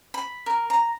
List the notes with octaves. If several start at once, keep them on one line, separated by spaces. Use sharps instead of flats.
B5
A#4
A#5